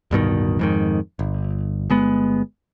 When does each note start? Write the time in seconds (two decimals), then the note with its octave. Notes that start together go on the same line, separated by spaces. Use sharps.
0.11 D1 G2 B2 D#3
0.59 F2 G#2 D#3
1.19 G1
1.90 G1 G#3 B3